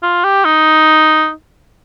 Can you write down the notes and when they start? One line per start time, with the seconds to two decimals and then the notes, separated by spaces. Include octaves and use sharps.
0.03 F4
0.24 G4
0.45 D#4